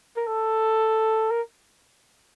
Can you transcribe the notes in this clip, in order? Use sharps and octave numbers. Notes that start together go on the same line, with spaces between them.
A#4
A4
A#4